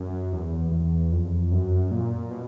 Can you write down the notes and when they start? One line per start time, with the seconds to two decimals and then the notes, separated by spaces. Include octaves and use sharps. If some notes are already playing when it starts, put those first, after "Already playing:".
Already playing: F#2
0.32 E2
0.72 E2
1.12 F2
1.51 F#2
1.91 A#2
2.31 B2